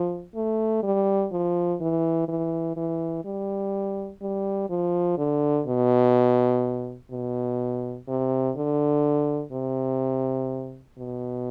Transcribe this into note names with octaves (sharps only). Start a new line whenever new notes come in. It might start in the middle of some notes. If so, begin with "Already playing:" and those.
Already playing: F3
A3
G3
F3
E3
E3
E3
G3
G3
F3
D3
B2
B2
C3
D3
C3
B2